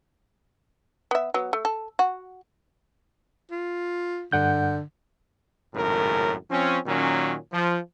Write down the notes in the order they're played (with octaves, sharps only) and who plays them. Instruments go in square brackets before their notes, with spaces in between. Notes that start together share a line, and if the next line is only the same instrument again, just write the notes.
[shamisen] B3 E5
F#3 B3
A3
A4
F#4
[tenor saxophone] F4
[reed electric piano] G2 F#5 G6 [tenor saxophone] D3
[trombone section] G#1 F#2 A2 C#3 A#4
F3 C4 C#4
A#2 D#3 F#3 C#4
F3